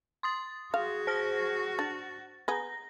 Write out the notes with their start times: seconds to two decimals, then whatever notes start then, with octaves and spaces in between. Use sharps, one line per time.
0.23 C6 D#6 A6
0.74 F#4 G#4 F5
1.07 C5 F6 A#6
1.79 D4 A6
2.48 B3 G#4 A#5 A#6